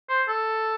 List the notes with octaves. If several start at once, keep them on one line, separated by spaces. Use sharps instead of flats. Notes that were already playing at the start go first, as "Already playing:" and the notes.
C5
A4